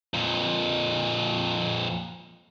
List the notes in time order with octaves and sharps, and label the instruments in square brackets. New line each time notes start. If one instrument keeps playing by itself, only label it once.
[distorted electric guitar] F2 A#2